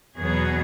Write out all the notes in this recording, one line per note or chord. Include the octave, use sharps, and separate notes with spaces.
E2 B2 F#3 B3 G#4